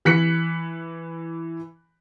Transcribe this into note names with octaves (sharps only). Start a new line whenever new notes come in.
E3 F#6 B6 C#7